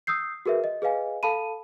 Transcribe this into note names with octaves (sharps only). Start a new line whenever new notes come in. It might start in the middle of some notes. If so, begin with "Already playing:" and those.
D#6 E6 G6 C7
F#4 G#4 A#4 B4 E5
D#5
G#4 B4 D#5 F5 G#5
A4 F5 A5 B5 D#7